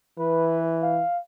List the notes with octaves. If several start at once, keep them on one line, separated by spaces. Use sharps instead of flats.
E3 B4
F5